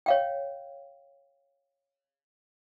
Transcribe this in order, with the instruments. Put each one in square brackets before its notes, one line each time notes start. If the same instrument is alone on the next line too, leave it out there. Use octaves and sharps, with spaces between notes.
[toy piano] C#5 F5 G5